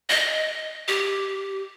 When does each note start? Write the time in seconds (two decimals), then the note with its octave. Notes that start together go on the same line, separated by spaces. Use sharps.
0.09 D#5
0.88 G4